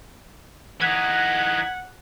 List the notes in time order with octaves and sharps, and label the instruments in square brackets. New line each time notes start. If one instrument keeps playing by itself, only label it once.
[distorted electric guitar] E3 D#4 [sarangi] F#5 [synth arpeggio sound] F#6 G#6 B6